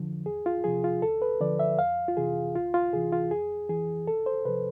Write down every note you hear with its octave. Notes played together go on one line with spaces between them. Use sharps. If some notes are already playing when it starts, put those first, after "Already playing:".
Already playing: F2 D3 F3
E2 G#4
F4
C3 F3 G#4
F4
D2 A4
B4
D3 F3 D5
E5
F2 F5
F4
C3 E3 G#4
D2 F4
F4
C3 E3 G#4
F4
F2 G#4
E3 G#4
C2 A4
C5
C3 F3 B4